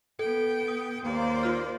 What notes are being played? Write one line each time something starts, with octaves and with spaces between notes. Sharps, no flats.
B3 A4 G5
D#6
D#2 A#3 C5 D5
F4 F6